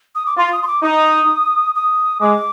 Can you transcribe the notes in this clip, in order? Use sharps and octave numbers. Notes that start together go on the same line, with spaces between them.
D#6
D6
F4 C6
D#6
C6
D6
D#4 D#6
D#6
G#3 D6